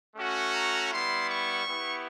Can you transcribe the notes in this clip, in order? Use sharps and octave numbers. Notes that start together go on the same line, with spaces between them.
A3 C#4 F#4
A#5
G3 B3 E4 C6
C#6
B3 E4 G4